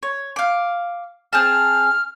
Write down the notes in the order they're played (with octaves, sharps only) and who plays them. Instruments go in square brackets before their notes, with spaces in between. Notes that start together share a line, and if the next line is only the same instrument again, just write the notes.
[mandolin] C#5
F5 D6
[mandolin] C4 G#4 A5 [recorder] F6